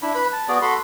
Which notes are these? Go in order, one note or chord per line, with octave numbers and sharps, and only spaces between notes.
D4 E4 B5
B4 B5
A5
B3 F#4 G#4 D5
F#4 A4 B5 C6